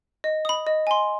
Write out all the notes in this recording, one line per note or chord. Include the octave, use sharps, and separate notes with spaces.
D#5
B5 D#6
D#5
G#5 C6